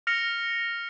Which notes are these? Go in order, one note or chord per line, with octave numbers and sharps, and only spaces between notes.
F6 A#6 C#7 F7